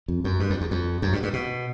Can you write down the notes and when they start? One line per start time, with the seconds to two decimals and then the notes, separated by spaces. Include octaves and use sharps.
0.08 F2
0.24 F#2
0.40 G2
0.50 F2
0.61 E2
0.71 F2
1.02 F#2
1.13 G2
1.23 G2
1.33 B2